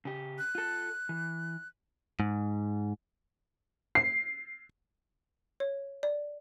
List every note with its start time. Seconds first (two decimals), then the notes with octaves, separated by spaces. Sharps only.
0.05 C#3 G4
0.38 F#6
0.55 F4 A4
1.09 E3
2.20 G#2
3.95 C7
5.60 C#5
6.03 D5